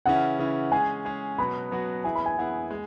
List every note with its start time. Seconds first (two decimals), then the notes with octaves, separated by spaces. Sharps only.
0.06 C#3 E3 C#4 E4 F#5
0.39 C#3 E3 C#4 E4
0.72 G#3 C#4 G#4 G#5
1.05 G#3 C#4 G#4
1.38 B2 F#3 B3 F#4 B5
1.71 B2 F#3 B3 F#4
2.04 E3 B3 E4 G#4 G#5
2.15 B5
2.26 G#5
2.37 E3 B3 E4 G#4 F#5
2.71 G#3